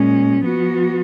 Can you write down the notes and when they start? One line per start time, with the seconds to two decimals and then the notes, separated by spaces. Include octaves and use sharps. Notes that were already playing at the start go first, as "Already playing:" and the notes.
Already playing: A#2 G#3 C#4
0.43 F3 B3 F#4